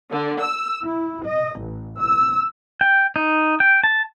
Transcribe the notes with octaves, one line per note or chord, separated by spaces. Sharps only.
D3
E6
E4
D#5
A1
E6
G5
D#4
G5
A5